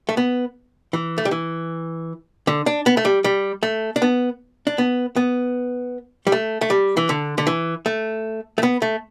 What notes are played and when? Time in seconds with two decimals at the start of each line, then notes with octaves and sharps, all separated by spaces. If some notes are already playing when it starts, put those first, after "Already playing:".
0.09 A3
0.17 B3
0.93 E3
1.18 A3
1.25 G3
1.31 E3
2.47 D3
2.66 D4
2.86 B3
2.97 A3
3.05 G3
3.24 G3
3.63 A3
3.96 D4
4.02 B3
4.67 D4
4.78 B3
5.16 B3
6.27 G3
6.32 A3
6.61 A3
6.70 G3
6.97 E3
7.09 D3
7.38 D3
7.47 E3
7.86 A3
8.58 A3
8.63 B3
8.82 A3